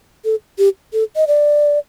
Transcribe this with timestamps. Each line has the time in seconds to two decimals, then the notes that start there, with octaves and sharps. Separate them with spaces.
0.25 A4
0.58 G4
0.93 A4
1.16 D#5
1.27 D5